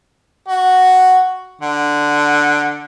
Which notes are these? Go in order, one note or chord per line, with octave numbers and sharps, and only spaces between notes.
F#4
D3